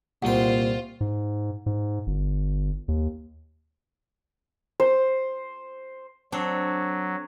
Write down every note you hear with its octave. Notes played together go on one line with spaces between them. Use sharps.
C2 A#2 F4 C5 F#5 G5
G#2
G#2
G1
D#2
C5
F#3 C4 D4 A4